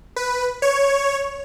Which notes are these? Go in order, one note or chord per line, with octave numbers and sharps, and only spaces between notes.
B4
C#5